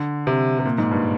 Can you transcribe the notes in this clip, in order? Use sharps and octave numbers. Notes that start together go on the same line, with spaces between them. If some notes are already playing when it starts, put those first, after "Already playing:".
Already playing: D3
C3
C3
A#2
G#2
G2